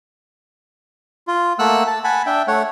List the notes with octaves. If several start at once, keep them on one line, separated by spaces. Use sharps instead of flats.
F4
A3 A#3 F#5 E6 F#6
A5
F#5 G#5 A5 B5
D4 E5 G5
A3 C#5 F#5